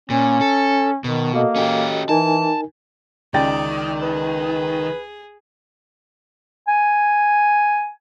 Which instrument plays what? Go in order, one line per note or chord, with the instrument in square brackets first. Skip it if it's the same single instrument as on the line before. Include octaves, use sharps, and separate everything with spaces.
[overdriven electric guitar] A#2 [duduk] C#4
[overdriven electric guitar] A4
[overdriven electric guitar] B2 [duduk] D#3
[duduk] A#3 [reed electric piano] F#4 A4 D#5
[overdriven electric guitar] C#4 G4
[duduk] E3 [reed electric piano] D#4 A#4 G#5 [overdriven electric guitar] A5
[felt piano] C#2 G5 A6 [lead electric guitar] D#3 [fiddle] D5
[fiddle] G#4 [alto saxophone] B4
[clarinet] G#5